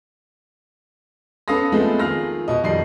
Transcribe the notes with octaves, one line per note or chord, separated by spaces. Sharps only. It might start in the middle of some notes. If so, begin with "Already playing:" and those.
B3 C#4 A4 F5 D#6 A#6
F3 G#3 A3 B3 C4
D#3 F4 G#4 F6 A#6
B2 D#5
F2 D#3 G3 D#5 C7